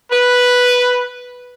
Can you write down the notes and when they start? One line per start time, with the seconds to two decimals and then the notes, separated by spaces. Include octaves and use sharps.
0.12 B4